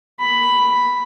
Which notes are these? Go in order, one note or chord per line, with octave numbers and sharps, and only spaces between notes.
B5